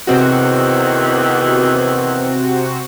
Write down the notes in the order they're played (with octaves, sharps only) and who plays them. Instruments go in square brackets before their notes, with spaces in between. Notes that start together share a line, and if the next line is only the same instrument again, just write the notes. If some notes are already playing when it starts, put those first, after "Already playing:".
[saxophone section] E2 D#3 E3 [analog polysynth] C3 C4 F#4